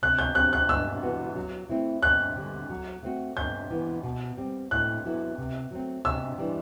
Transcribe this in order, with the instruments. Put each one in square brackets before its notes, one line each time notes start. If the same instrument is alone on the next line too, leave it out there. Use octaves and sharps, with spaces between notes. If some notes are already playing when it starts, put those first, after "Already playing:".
[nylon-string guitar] C3 [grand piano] F#6
[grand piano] G6
[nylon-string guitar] F#3 C4 G4 [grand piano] F#6
[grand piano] F#6
[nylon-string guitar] G2 [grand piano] E6
[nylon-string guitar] E3 B3 F#4
F#3
A3 C4 E4
[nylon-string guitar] F#2 [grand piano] F#6
[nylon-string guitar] D3 G3
F#3
A3 C4 F#4
[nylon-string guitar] G2 [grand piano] G6
[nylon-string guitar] E3 B3
B2
G3 C4
[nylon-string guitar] A2 [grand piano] F#6
[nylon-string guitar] F#3 B3 E4 A4
C3
F#3 A3 C4
[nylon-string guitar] C3 [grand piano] E6
[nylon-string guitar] E3 G3 D4